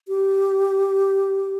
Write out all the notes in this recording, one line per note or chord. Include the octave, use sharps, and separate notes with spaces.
G4